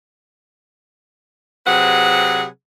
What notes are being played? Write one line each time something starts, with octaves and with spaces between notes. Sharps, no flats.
C3 F#3 C4 G#4 B4 F#5